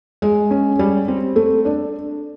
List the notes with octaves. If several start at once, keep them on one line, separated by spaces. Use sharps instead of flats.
G#3
C#4
G3
C4
A3
D4